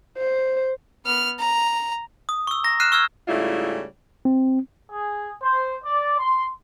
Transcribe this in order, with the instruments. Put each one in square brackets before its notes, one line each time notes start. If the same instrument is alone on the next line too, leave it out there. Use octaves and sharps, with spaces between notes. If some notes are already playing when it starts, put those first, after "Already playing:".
[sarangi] C5
[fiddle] B3 F6
A#5
[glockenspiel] D#6
C#6 E6
A#5 A#6
F6 F#6 C7 D#7 E7
C#6 E6 F6 G#6
[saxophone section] G#2 C#3 G3 A3 E4 F4
[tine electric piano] C4
[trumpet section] G#4
C5
D5
C6